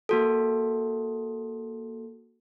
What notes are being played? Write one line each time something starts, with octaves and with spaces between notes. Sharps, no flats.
A#3 F#4 A4